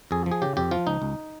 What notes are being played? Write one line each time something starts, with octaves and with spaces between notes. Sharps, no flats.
F2 G#4
F3
G#4
C#3 G4
F2 G4
F3 F4
C#2 D#4
C#2